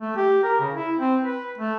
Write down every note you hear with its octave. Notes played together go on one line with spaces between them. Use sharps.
A3
G4
A#4
C#3
E4
C4
B4
A3